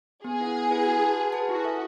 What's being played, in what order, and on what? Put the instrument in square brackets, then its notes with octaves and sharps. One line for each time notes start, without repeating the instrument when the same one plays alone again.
[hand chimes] B3 [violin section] G#4
[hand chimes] E4 B4 F#5
B3
E4 B4 F#5
F#4
B4 F#5 A5
F#4
B4 F#5 A5
[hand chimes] E4 [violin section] F#4
[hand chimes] A4 E5